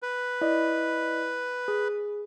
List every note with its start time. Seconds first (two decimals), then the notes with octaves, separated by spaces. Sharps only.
0.02 B4
0.41 E4 D5 D#5
1.68 G#4